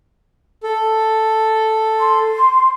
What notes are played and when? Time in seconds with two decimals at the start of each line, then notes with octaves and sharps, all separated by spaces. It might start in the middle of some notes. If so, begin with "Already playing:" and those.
0.63 A4
1.99 C6